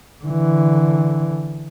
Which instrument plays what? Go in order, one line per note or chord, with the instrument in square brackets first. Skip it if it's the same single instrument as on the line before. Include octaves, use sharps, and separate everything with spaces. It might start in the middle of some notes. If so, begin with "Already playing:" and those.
[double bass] D3 E3